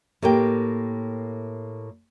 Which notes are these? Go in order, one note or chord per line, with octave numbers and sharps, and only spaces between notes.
A2 A#3 G4 G5